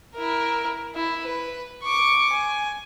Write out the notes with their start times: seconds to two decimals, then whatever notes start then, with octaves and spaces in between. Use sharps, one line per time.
0.15 E4 A#4
0.94 E4
1.24 B4
1.83 C#6 D6
2.32 G#5